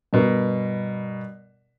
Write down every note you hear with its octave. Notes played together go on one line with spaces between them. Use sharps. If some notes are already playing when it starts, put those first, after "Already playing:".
G2 B2 A#4